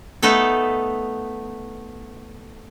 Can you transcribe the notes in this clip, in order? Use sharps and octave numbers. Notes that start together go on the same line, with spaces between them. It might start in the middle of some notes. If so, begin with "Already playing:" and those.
A3 B3 D#4 A4